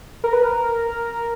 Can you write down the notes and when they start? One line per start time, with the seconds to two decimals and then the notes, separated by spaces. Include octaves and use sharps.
0.24 A#4
0.33 B4
0.43 A#4